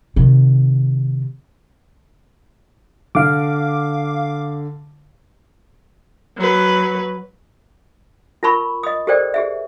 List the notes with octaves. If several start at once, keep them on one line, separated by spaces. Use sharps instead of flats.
C3 D#3
D3 F5 D6
F#3 B4
F4 A#4 A5 B5 C#6
D#5 D#6
G4 A4 A#4 C5 D5 G5
G4 G#4 E5